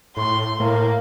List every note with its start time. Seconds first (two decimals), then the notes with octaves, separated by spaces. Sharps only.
0.17 A2 C6
0.60 A2 A#3